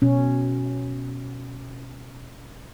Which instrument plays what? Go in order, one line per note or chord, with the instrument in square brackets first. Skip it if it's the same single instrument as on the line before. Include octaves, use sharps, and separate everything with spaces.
[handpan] B2 C#4